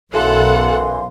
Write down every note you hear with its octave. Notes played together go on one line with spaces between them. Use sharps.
B1 F#2 E3 A4 F5 F#5 C6